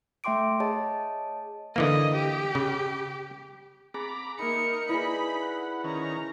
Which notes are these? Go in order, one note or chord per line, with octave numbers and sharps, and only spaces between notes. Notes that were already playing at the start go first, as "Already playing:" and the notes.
A3 E5 G5 C6 D6 D7
G#4 C#5 D#5 A5
D3 E3 A#3 D#5
G4
C#3
C4 G#4 G#5 A#5 B5 D6
A#3 D#4 A#4 E5 B5 C#7
E4 G#4 B4 D5 B5 A#6
F#5
D#3 C#4 A#5